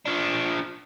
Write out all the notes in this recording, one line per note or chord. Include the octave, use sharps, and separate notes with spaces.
F3 D4